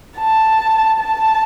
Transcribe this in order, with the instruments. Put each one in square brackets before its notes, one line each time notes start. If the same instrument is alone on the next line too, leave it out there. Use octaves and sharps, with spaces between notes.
[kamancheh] A5
A5